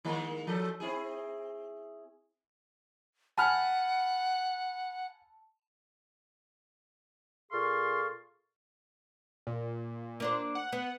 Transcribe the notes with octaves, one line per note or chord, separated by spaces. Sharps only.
D#3 G#3 A#3
F3 A4
C4 E4 G#4
F#5 G#5 A5 B5 F6
A#2 G#4 A4 F5 C6 C#6
A#2
A#3 D4 C5
F#5
B3